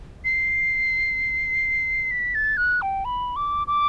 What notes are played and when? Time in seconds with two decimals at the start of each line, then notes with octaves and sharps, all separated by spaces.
0.24 C7
2.11 B6
2.35 A6
2.57 F#6
2.82 G5
3.05 B5
3.36 D6
3.67 D6